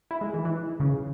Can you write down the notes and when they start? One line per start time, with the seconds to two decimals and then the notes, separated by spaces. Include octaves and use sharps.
0.11 E4
0.21 G#3
0.34 E3
0.45 E3
0.80 C#3